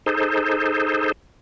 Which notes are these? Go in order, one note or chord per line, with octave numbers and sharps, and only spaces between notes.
D#4 G#4 A4 C5